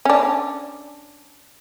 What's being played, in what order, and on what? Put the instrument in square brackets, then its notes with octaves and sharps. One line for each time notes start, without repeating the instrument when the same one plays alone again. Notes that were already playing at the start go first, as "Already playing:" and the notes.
[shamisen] C#4 D4